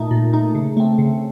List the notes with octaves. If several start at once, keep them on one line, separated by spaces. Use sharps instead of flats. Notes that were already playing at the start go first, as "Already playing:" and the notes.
Already playing: A#2 A3 D#4
A#2
A3 D#4
C#3
A3 C4
C#3